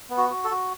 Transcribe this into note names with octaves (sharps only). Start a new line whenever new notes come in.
B3
F#4
F#4
A4
F#4